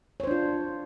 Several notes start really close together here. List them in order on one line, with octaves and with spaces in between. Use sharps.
C#5 C5 D4 F4